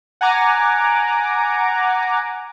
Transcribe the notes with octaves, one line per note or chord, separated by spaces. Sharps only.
F#5 G#5 A#5 D6